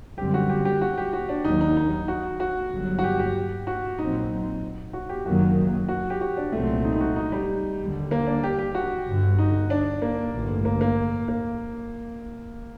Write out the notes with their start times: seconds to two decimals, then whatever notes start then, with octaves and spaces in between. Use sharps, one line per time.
0.18 F#2 D3 G3 C4 G4
0.34 F#4
0.49 G4
0.65 G4
0.82 F#4
0.98 G4
1.13 F#4
1.29 D4
1.45 D#2 D#3 F#3 D#4
1.61 D#4
1.77 D#4
2.08 F#4
2.40 F#4
2.72 G1 G2 F#3
2.99 F#4
3.04 G4
3.19 G4
3.67 F#4
3.99 A#1 A#2 F#3 C4 D#4
4.93 F#4
5.09 G4
5.26 F#1 F#2 D#3 F#3 A#3 F#4
5.89 F#4
6.10 G4
6.21 F#4
6.37 D4
6.52 C2 A#2 F#3 A3 C4
6.84 D#4
6.95 D#4
7.00 F#4
7.16 D#4
7.32 G3
7.79 D#2 D3 G3
8.11 A#3
8.27 D4
8.43 G4
8.59 G4
8.75 F#4
9.06 G1 G2 D3
9.39 D#4
9.70 D4
10.02 A#3
10.33 A1 G2 D3
10.65 A#3
10.81 A#3
11.28 A#3